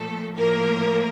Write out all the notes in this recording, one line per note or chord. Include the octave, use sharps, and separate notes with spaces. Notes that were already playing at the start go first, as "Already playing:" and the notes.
Already playing: A#2 F3 A3 A4
A2 F3 A#3 A#4